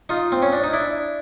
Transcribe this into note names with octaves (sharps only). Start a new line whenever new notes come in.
D#4 F4
C4
C#4
D4
D#4
D4 E4